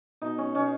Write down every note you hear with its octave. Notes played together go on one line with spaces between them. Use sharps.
B2 D#4
C#4
B2 C#4